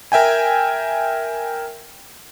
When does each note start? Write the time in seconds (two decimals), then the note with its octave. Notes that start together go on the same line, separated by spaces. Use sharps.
0.12 A#4 E5 G5 G#5